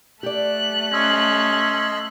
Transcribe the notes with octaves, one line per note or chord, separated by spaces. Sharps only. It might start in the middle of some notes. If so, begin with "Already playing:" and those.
A3 G4 D5 F#6
C#4 D#5 C6 E6